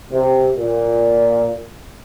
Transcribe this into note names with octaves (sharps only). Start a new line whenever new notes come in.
C3
A#2